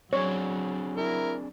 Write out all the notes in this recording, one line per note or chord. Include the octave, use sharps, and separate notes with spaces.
F#3 C4 D4 G#4 C#5
E4 A#4